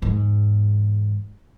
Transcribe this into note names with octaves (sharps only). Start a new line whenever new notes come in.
E2 G#2